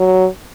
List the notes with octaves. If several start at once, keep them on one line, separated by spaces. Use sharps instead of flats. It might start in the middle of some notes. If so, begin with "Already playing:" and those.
Already playing: F#3